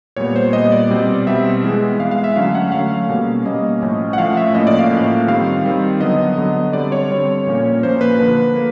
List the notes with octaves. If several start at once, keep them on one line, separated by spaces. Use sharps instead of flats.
A#2 G3 B3 C#5
C5
A#2 G3 B3 D#5
D5
B2 G3 C4
B2 G3 C4 E5
E3 G#3 B3
E3 G#3 B3 F5
F5
E5
D3 F#3 A3 C#4 F5
F#5
D3 F#3 A3 C#4 F5
B2 G3 A#3 C#4
B2 G3 A#3 C#4 D#5
A2 F3 A3 C#4
F#5
A2 F3 A3 C#4 F5
E5
A2 F3 A#3 C#4 D#5
D5
F5
A2 F3 A#3 C#4
D#3 G3 C4 F5
D#3 G3 C4
D3 F#3 B3 D#5
D3 F#3 B3
D3 G3 C4 D5
C#5
D3 G3 C4
A#2 F3 A#3 C#4
A#2 F3 A#3 C#4 C5
B4
D3 F3 A#3 B4
A#3